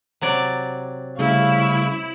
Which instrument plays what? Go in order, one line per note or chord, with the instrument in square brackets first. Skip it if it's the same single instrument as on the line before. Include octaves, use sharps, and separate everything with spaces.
[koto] C3 F#3 D5
[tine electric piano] C#3 G3 A3 [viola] E4 [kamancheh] F5 C#6